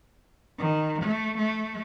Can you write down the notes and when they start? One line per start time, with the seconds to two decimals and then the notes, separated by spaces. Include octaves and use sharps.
0.58 D#3
1.02 A3
1.38 A3